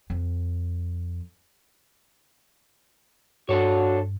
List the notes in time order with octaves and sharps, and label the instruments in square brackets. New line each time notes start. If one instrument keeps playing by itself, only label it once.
[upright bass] F2
[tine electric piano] G2 [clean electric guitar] D4 A4 C#5 [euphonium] F#4